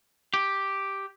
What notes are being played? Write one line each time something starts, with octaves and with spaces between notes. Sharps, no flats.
G4